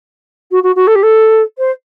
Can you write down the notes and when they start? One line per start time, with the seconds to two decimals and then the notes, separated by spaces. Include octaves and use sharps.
0.51 F#4
0.63 F#4
0.75 F#4
0.87 A4
0.95 G4
1.02 A4
1.58 C5